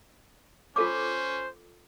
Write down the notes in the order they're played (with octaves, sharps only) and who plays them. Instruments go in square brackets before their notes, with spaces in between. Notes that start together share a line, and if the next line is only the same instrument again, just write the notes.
[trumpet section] C#4 C5 [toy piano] F4 A4 D6